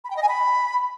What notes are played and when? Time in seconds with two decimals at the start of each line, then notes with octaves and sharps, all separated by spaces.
0.04 B5
0.10 G5
0.16 D#5
0.23 G#5
0.29 B5